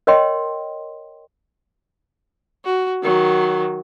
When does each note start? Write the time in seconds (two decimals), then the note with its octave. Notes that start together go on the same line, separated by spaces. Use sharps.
0.07 A#4 C#5 D#5 G5 C6
2.65 F#4
3.03 D#3 F#3